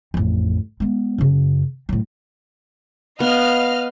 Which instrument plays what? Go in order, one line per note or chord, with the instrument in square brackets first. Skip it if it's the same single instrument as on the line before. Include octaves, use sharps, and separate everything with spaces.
[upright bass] A1 F2
G#3 B3
F#2 C#3
A2 F#3
[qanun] B3 [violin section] D#5 F5 F6